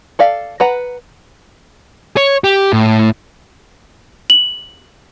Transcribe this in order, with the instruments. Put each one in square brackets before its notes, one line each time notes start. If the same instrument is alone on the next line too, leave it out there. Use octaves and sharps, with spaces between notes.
[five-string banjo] A4 D5 F5
B4 F#5 A#5
[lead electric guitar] C#5
G4
A2
[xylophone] F#7